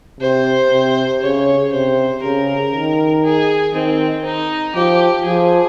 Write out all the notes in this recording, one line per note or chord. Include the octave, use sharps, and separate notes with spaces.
C3 C5
C3
C#3 C#5
C3 C5
C#3 A#4
D#3
G#4
D#3 C4
D#4
F3 G4
F3 G#4